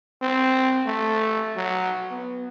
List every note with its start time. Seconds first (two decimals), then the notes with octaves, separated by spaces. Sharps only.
0.21 C4
0.86 A3
1.56 F#3
2.11 B3